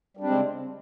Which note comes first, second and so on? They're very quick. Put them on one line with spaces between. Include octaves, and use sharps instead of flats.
G3 D4 C4 G#3 C#3